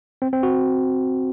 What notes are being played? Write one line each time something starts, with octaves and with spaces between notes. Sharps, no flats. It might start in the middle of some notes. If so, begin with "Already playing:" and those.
C4
C4
F#4